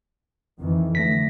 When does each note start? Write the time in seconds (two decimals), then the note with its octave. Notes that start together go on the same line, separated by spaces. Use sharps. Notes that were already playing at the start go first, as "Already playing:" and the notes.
0.59 F2 D#3 E3
0.95 D3 A3 A#6 B6